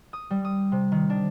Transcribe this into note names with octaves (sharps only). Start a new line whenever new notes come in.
D#6
G3
D#6
C3
D#3
D4